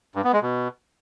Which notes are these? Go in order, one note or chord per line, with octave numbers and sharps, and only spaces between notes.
G2
B3
G#3
B2